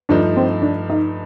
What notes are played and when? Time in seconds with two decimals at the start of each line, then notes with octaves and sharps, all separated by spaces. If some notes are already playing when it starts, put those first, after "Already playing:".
0.09 G2 F3 A3 D4 D#4
0.37 C4
0.62 D4
0.90 D#4